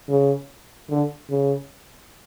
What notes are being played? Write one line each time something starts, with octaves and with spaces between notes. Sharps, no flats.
C#3
D3
C#3